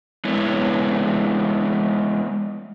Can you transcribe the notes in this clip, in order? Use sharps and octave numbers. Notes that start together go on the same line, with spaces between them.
G#3 B3 E4 C#5